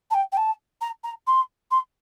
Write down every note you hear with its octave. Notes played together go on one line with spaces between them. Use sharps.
A5
G5
G5
A5
A#5
A#5
C6
C6